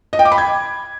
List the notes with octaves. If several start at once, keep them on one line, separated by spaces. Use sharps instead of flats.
D#5
G5
D6
B5
G#6